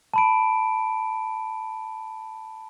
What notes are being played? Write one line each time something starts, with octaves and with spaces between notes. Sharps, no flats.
A5 B5 D7